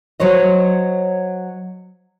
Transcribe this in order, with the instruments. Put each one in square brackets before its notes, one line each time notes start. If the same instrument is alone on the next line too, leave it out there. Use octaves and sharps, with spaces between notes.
[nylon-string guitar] F#3 C5 C#5 D#5